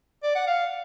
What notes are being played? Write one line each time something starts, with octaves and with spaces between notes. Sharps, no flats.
D5
F#5
F5